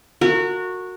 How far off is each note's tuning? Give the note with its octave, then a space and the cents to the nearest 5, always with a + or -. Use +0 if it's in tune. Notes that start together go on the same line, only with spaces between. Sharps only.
F#4 -15 A#4 -30